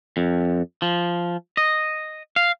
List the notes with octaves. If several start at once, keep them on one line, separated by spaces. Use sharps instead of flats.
F2
F3
D#5
F5